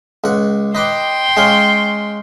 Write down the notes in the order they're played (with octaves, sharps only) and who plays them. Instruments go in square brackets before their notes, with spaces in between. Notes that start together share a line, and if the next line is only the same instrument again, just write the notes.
[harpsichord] C#2 F#5
[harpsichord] D#4 B4 D6 [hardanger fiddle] G5 C6
[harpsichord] G#3 C#4 F5